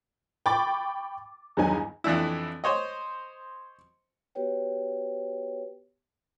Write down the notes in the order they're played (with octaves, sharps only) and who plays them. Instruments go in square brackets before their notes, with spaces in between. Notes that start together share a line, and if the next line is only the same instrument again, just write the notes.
[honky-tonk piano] G5 B5 C#6 D6 A6
E2 G2 D#3 F#3 D#4 G#5
[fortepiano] F2 E3 D4 E4
C5 C#5 D#5
[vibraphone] B3 F#4 G4 B4 C#5 G5